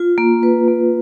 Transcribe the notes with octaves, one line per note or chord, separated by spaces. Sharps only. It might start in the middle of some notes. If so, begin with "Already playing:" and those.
Already playing: F4
A#3
B4
A#3